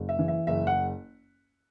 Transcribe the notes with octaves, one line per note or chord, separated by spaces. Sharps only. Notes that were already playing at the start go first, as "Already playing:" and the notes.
Already playing: F#1
E5
E3
E5
F#1 E5
F#5